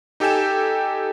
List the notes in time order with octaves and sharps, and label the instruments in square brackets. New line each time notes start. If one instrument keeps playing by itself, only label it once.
[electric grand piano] D#4 G4 A4 G5 G#5 E7